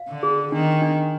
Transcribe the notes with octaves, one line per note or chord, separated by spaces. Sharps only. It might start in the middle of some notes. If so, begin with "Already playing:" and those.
Already playing: F5
D3
G#4
D#3 D4
D4